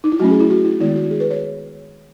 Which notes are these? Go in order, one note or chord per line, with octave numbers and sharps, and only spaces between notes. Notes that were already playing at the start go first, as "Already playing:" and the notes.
D#4
E4
F#3 A3 C#4 F#4
G#4
E4
F#4
E4
D#3 G#3 B3 E4
F#4
G#4
B4
C#5